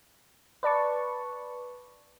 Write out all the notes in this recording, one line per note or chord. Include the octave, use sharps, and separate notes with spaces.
B4 D5 A5 C#6